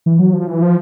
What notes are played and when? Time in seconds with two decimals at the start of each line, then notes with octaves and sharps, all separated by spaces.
0.06 E3
0.19 F#3
0.33 F3
0.47 E3
0.62 F3